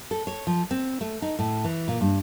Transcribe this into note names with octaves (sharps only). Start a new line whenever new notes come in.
A4
C#5
F3
C4
A3
D#4
A2
E3
A#2
G2